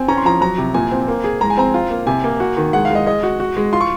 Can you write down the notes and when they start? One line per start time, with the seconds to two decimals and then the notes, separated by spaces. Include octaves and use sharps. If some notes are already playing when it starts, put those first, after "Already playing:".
Already playing: C4 G#5
0.08 C#4 A#5
0.18 C6
0.25 F3 A#5
0.41 F#3 A#5
0.58 C3
0.74 A#2 G#5
0.91 C4
1.08 A#3
1.24 G#4
1.41 G#3 A#5
1.50 G#5
1.57 C4 A#5
1.74 F4
1.91 A#3
2.07 C3 G#5
2.24 A#3
2.40 F#4
2.57 D#3
2.73 G#3 F#5
2.85 F5
2.90 G#3 D#5
3.06 G#3 D#5
3.23 F#4
3.40 F#4
3.57 G#3
3.73 F4 C6
3.81 C#6